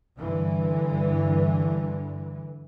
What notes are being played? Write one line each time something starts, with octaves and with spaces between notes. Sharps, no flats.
G2 D3 E3